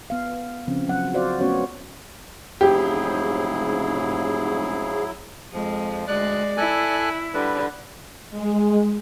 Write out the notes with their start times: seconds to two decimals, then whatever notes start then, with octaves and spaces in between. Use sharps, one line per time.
0.10 B3 F5
0.67 C#3 F3 C4
0.87 F#3 F#5
1.13 F4 F#4 C5 D5 F5
1.41 A3 B3 C#4 F#4 C#5
2.61 F1 G#2 C#3 F#3 E4 G4 G#4
5.53 F2 F3 G#3
6.08 D2 G#3 D5 F#6
6.57 E4 A4 G#5 F#6
7.34 D3 G3 B4
8.30 G#3